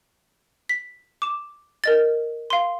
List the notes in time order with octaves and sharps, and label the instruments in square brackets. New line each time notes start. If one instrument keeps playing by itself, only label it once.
[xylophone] B6
D6 E7
A#4 D#5 A6
F5 C6